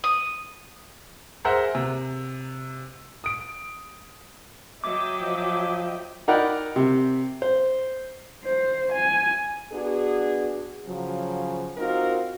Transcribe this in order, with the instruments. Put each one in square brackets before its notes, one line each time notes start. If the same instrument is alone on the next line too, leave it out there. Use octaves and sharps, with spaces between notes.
[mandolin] D#6
[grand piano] G#4 A#4 C5 E5 F#5 A#5
C3
D#6 D7
[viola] F#3 [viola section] D#5 E5 G5 [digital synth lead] D6
[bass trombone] F3
[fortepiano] D#4 A#4 D5 F#5 G5 B5
C3 G4
C5
[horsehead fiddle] C5
G#5
[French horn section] B3 D4 F#4 G#4
C#3 F3 F#3
C4 D#4 F4 F#4 A#4